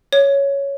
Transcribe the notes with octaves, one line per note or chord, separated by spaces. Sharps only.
C#5